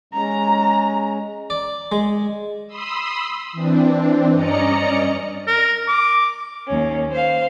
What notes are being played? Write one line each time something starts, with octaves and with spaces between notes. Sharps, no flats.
G#3 C#4 A#5
D5
G#3
B5 C6 D#6 E6
E3 C4 D4
G2 C#4 D5 D#5 A#5 C#7
A#4
D6
D#2 C#4
C5 F5